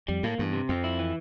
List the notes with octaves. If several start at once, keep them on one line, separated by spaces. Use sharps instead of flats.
F2 G3
A2 A#3
E2 G2
C3
F2 C4
E4
E3